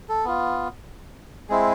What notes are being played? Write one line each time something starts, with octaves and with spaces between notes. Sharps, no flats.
A4
B3 F4
G#3 C4 E4 G#4